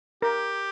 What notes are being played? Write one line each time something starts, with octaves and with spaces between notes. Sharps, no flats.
G4 A#4